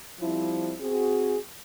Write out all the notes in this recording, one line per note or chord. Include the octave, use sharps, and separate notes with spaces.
F3 G3 C4 E4
C4 F#4 G#4